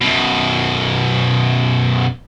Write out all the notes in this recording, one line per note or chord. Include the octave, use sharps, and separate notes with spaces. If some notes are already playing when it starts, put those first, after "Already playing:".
F#2 B2